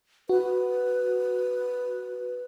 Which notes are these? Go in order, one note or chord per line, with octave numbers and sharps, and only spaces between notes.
F#4 B4